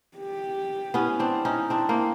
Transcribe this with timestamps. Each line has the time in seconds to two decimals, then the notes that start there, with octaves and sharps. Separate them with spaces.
0.18 G4
0.94 B3 C#4 E4
1.19 C4 D4
1.45 C#4 D#4
1.70 C4 D4
1.89 A#3 C4